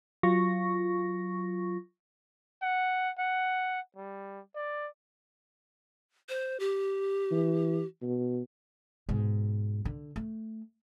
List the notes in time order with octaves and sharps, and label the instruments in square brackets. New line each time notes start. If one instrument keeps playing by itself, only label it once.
[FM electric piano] F#3 F4 C#6 A#6
[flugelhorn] F#5
F#5
G3
D5
[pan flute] C5
G4
[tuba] E3
B2
[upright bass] G#2 B2
D3
A3